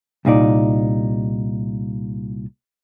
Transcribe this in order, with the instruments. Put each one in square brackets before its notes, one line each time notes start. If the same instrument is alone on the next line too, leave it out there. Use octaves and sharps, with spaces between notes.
[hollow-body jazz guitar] C2 A#2 D#4 D5